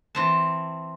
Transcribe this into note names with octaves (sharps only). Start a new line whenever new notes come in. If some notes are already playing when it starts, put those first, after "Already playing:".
E3 C4 A5